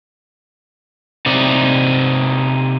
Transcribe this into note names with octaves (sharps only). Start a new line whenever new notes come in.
C3 D#4 D5